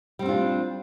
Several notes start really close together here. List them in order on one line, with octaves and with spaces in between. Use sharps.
G3 C4 D4 F4